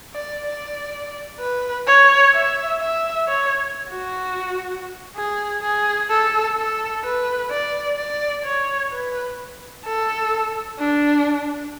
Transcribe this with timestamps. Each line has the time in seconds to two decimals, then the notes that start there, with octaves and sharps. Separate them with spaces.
0.14 D5
0.46 D5
1.40 B4
1.87 C#5
2.34 E5
2.81 E5
3.28 C#5
3.90 F#4
5.16 G#4
5.62 G#4
6.10 A4
6.57 A4
7.04 B4
7.50 D5
7.97 D5
8.44 C#5
8.92 B4
9.85 A4
10.79 D4